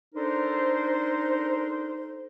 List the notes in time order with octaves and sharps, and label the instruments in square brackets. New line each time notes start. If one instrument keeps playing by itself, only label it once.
[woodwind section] D4 D#4 A4 A#4 C5